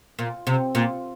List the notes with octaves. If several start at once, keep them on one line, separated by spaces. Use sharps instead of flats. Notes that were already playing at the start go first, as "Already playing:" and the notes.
A#2
C3
A#2